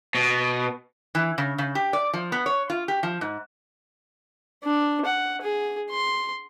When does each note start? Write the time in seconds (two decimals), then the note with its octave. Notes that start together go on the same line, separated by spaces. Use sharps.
0.15 B2
1.15 E3
1.38 C#3
1.58 C#3
1.75 G4
1.93 D5
2.13 F3
2.32 B3
2.46 C#5
2.70 F4
2.88 G4
3.03 F3
3.21 G#2
4.63 D4
5.05 F#5
5.42 G#4
5.90 C6